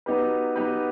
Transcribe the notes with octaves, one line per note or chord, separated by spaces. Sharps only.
F#3 B3 D#4 G4 B4
F#3 B3 D#4 G4 B4